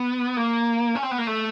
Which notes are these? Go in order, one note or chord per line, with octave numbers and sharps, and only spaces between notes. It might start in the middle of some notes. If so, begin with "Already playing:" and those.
Already playing: B3
A#3
C#4
C4
B3
A#3
A3